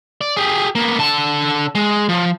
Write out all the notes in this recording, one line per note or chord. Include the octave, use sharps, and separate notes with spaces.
D5
G4 G#4
A#3 B3
D3 A5
G#3
F3